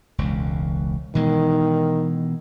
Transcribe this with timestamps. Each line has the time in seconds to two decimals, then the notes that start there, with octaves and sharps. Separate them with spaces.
0.18 E1 C#2
1.15 B2 D#3 E3 G#3